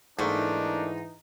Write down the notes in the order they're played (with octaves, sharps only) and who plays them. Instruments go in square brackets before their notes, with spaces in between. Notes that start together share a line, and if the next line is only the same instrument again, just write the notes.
[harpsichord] G#2 [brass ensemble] E3 D#4 [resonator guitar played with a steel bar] A3 A#3 [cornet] D4